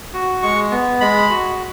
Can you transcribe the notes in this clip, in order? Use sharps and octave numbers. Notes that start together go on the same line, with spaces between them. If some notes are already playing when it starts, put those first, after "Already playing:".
F#4
G#3 C#6
B3
G#3 B5
F#4